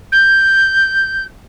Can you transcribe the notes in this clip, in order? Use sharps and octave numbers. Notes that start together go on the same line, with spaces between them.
G6